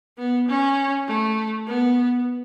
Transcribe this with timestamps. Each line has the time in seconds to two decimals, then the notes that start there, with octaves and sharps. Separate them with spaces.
0.18 B3
0.48 C#4
1.07 A3
1.67 B3